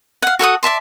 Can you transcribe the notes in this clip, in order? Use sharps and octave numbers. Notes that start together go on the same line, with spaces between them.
F5 F#5
F#4 A4 F#5 D#6
D5 E5 A5 C6